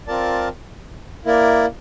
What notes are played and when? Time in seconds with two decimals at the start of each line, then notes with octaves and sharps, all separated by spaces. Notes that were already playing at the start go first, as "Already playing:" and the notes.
0.07 C4 F4 A#4 D5 A5
1.25 A#3 E4 A#4 D5